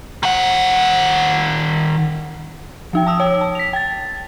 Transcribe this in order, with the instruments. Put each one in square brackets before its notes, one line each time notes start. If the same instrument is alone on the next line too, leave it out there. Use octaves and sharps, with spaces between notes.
[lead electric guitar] D#3 F#5
[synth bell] F3 D#4 G5
A5 D#6 E6
C#5 G5
A5
B6 F7
G5 A6